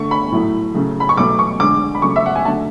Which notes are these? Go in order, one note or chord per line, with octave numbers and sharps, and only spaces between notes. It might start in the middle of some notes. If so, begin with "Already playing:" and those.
Already playing: D3 A3 C#6
B5
A2 F#3 A3
C#3 F#3 A3
B5
C#6
B2 F#3 A3 D6
C#6
D3 G#3 D6
B5
C#3 F#3 A3 C#6
E5
F#5
G#5
D3 F#3 A3 A5